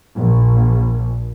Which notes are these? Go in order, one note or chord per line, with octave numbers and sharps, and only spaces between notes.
A#1